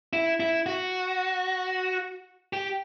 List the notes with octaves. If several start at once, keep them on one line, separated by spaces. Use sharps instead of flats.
E4
E4
F#4
G4